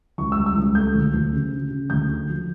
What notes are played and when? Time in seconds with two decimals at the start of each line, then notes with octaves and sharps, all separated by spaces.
0.18 C#2 C#6
0.32 E6
0.38 G3
0.46 E6
0.56 C#2
0.75 A3 G6
0.95 D2
1.14 D2
1.32 C#3
1.53 C#3
1.71 C#3
1.90 D2 G6
2.10 D3
2.29 F3